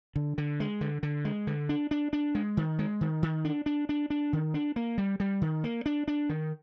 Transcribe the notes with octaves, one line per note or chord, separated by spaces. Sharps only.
D3
D3
G#3
D3
D3
G#3
D3
D4
D4
D4
G#3
D#3
G#3
D#3
D#3
D4
D4
D4
D4
D#3
D4
A#3
G3
G3
D#3
A#3
D4
D4
D#3